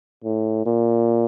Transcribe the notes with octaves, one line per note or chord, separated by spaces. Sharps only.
A2
A#2